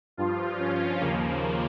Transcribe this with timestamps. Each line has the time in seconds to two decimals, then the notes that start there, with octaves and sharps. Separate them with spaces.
0.17 G2 F3 F4
0.59 C#4
1.01 D#2 C#3 F3 A#3